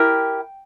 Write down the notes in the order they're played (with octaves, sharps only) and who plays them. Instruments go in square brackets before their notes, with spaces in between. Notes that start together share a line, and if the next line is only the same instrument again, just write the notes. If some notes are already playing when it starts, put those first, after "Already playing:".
Already playing: [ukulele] E4 G4 A#4 G5